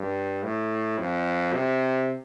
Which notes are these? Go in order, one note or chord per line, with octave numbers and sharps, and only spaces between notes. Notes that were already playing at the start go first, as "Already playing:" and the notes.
Already playing: G2
A2
F2
C3